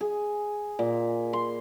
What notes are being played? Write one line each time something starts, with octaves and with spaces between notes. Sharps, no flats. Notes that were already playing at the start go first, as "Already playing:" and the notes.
G#4
A#2
C6